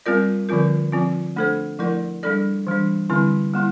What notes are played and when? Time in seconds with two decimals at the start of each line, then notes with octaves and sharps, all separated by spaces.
0.06 G3 C4 F4 A#4 D5
0.49 D3 F3 C4 F4 A#4
0.92 F3 C4 F4
1.36 A3 D4 A4 C5
1.79 F3 A3 E4 A#4 D5
2.23 G3 D4 A4 D5
2.67 E3 G3 D4
3.10 D3 G3 C4 E4
3.54 G3 A#3 E4